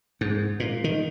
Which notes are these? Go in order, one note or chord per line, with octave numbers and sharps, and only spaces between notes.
G#2
A#2
D#3